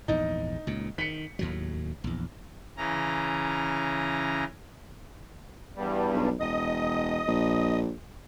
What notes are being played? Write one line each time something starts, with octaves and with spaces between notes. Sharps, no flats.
A#1 E2 G#2 D#4
C#2 A#2
D#3 B6 C#7
D#2 A2 F#3
A#1 E2
C#3 E3 C#4 A#5
E2 G2 G3
B1
E1 D#5 D#6
A#1